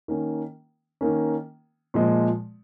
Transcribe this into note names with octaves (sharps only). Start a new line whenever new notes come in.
D#3 A#3 C#4
D#3 A#3 C#4
A#2 F3 G#3